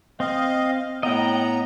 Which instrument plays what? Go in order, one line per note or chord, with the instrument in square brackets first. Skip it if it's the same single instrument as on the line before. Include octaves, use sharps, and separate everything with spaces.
[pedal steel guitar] C4 [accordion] D#5 F5
[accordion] A2 A#5 [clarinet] B3 [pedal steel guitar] D#5 G5